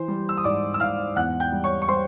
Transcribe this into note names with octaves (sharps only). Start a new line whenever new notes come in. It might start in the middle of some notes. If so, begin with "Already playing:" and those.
Already playing: E3 C5 C6
G3
E6
D#6
G#2 D5 D6
E6
G#2 F5 F6
E2 F#5 F#6
G5 G6
G3
C#5 C#6
C#6
G3 C5 C6